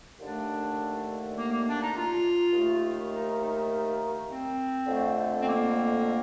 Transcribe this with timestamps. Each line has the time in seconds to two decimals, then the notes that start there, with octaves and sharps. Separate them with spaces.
0.19 D#2 D3 A3 D4
1.36 A#3
1.51 A#3
1.66 D4
1.80 D#4
1.95 F4
2.53 D#2 D#3 A3
3.12 D#4
3.41 D#4
4.28 C4
4.87 F2 D3 A3
5.39 C4
5.46 A#3